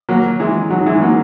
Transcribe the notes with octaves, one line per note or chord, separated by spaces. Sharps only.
F#3 A#3
E3 G#3
D#3 F#3
E3 G#3
F#3 A#3